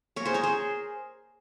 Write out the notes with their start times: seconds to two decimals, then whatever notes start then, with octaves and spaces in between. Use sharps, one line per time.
0.16 A#4 C#5
0.25 G#4 C5
0.34 A#4 C#5
0.43 G#4 C5